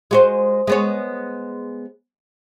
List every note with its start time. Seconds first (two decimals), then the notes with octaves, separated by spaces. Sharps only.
0.11 G#3 F#4 C5
0.67 G#3 B3 C#5